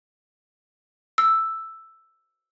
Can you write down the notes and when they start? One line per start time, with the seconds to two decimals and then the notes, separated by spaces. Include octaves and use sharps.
1.18 E6